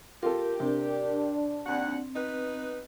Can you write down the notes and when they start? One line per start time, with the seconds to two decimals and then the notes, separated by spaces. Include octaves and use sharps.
0.23 F4 G4 A4 A#4
0.60 C3 D4
1.66 D#2 C4 F#5
2.16 B3 D#4 B4